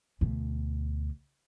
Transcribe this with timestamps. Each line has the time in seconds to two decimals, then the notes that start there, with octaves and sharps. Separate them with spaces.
0.21 D2 B2